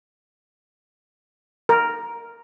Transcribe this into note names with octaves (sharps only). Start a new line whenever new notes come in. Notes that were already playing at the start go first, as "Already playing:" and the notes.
A#4